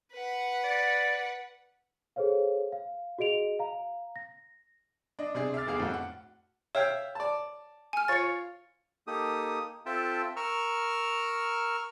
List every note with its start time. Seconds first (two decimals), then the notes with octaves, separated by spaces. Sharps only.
0.13 B4 F#5
0.64 D5
2.16 G#4 A4 C5 C#5 F5
2.72 F5
3.19 F#4 G#4 D#5 D7 F7
3.59 F5 A#5
4.16 A#6
5.19 D4 D#5
5.35 C3 D4 G#4
5.54 E5 D6 F6 A6
5.66 F1 E2 G#4 F5 D6
5.79 F2 A2 F#4
5.94 F#5
6.75 C#5 E5 F5 G5
7.15 D5 A5
7.93 G#5 F6
8.08 F4 C#5 A6 C#7
9.07 A#3 D#4 G4 A4 D#6
9.86 C4 F4 A4 E5 G5 A5
10.36 A#4 A#5 C#6 E6 F6